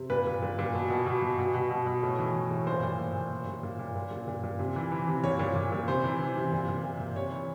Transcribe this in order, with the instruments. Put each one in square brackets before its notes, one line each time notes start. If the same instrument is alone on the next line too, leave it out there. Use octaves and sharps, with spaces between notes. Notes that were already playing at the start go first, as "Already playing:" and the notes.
Already playing: [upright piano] C3
A#2 B4
A#2
A#2
A#2
B2
B2
B2
B2
B2
B2
B2
B2
A2
E3
E3
A2
A#2 C5
A#2
A#2
A#2
A#2
A#2
A#2
A#2
A#2
A#2
A#2
A#2
C3
E3
E3
C3
A#2 C#5
A#2
A#2
A#2
C3 C5
E3
E3
C3
A#2
A#2
A#2
A#2
C3 C#5
E3